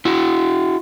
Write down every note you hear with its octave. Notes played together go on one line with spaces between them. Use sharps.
E4 F#4